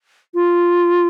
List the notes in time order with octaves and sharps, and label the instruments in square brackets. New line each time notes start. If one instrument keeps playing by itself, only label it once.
[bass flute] F4